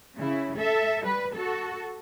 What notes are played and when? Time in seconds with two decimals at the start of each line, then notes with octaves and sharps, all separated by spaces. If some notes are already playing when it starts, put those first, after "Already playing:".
0.17 C#3 E4
0.57 A4 E5
1.05 G3 B4
1.34 F#4 A4